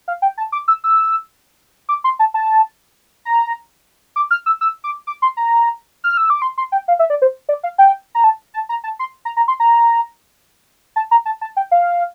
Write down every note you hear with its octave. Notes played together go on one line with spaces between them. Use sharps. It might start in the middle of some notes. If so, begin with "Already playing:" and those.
F5
G5
A5
D6
E6
E6
D6
C6
A5
A5
A#5
D6
F6
E6
E6
D6
D6
C6
A#5
F6
E6
D6
C6
C6
G5
F5
E5
D5
C5
D5
F5
G5
A#5
A5
A5
A#5
A5
C6
A#5
A#5
C6
A#5
A5
A#5
A5
A5
G5
F5